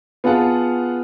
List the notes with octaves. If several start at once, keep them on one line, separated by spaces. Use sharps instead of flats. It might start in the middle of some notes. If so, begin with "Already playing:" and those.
B3 F4 G#4 F5 F#5 A5